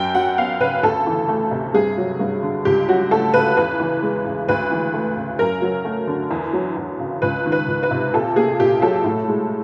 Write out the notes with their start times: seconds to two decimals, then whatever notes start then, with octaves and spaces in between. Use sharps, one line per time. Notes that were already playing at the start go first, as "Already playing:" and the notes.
Already playing: F#2 G5
0.15 F#3 F#5
0.37 B3 F5
0.60 C#3 B4
0.83 D2 A4
1.07 E3
1.28 A3
1.51 C3
1.74 G2 G#4
1.98 F#3
2.19 G2
2.43 D3
2.65 C#2 G4
2.88 F#3 F#4
3.11 A3 A4
3.34 C#3 B4
3.57 E2 B4
3.80 E3
4.03 G#3
4.26 C#3
4.49 D2 B4
4.71 E3
4.94 A3
5.17 C#3
5.39 F#2 A#4
5.62 F#3
5.85 A3
6.08 D3
6.31 E2
6.53 F#3
6.77 E2
6.99 C#3
7.22 C#2 B4
7.46 D#3
7.52 B4
7.68 C#2
7.83 B4
7.91 C3
8.13 A#2 A4
8.36 A#3 G#4
8.60 A#2 G4
8.82 F#3 A4
9.04 A2
9.28 G#3